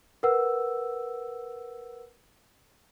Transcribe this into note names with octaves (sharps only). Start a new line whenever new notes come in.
A#4 B4 F#5 E6